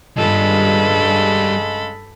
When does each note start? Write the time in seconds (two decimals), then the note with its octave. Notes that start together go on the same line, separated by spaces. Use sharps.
0.17 G2 C#3 G3 G#3 F4 A4 B5